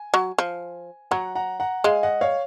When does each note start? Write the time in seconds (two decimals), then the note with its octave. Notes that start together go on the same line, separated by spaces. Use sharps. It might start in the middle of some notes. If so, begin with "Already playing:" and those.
Already playing: G#5
0.14 F#3
0.38 F3
1.11 F#3 F#5 A#5
1.35 F#5 A#5
1.60 F#5 A#5
1.84 G#3 F5 G#5
2.03 D#5 F#5
2.21 C#5 F5